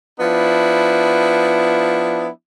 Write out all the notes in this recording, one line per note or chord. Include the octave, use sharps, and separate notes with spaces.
F3 B3 D4 E4